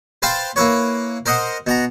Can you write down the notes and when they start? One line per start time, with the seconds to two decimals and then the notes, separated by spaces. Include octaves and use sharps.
0.22 B4 C5 F5 G5 A5 B5
0.56 A#3 E4 B4 C#5
1.26 A#4 C5 D#5 F#5
1.67 B2 F#5 A#5